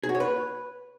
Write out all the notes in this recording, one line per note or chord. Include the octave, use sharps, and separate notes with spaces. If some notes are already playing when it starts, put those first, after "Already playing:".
G#4
F#4
C#5
B4